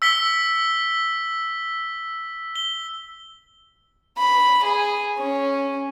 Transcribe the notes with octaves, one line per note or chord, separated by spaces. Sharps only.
E6 B6 G7
G7
B5
G#4
C#4